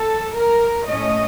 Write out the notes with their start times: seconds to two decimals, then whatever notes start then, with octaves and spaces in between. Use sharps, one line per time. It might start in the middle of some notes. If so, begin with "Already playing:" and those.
Already playing: A4
0.35 A#4
0.87 A2 A3 C#4 D#5